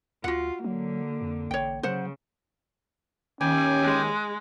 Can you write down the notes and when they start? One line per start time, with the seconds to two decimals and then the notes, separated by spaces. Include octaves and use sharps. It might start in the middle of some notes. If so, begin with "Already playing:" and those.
0.24 D2 F4 F#4 F#5
0.64 D3 F#3 A#3
1.21 F2
1.51 A1 C#5 G5
1.83 C#3 F#3 C5 F#5
3.41 D#2 C#4 G5 G#5 D6
3.83 G#3